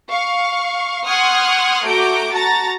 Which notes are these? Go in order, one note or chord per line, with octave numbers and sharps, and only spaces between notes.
F5 C#6
F#5 C6 C#6 D#6 F6 G#6
A3 F#4 A#5 D6 G6 D7
F#4 A5 A#5 A6